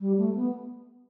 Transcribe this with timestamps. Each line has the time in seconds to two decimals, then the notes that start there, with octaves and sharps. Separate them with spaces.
0.01 G3
0.18 A3
0.35 B3